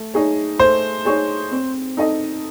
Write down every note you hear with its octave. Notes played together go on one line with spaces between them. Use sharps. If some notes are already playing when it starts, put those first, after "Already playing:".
Already playing: A3
D#4 G#4 C#5
A3 C5
D#4 G#4 C#5
C4
D#4 A4 D#5